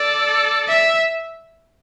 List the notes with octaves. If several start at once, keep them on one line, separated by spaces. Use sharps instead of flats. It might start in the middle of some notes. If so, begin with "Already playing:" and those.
Already playing: A4 D5
E5